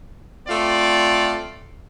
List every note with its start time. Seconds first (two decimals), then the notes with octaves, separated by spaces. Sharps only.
0.48 A3 C4 F4 D5